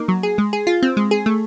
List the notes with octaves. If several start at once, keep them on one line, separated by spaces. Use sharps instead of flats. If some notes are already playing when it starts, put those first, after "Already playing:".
Already playing: A#3 D#4
F#3
G#4
G#3
G#4
F4
C4
G#3
G#4
A3